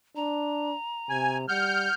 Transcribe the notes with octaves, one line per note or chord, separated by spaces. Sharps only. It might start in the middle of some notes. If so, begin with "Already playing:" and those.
D4 A#5
C3 G#5
G3 F#5 F6 G6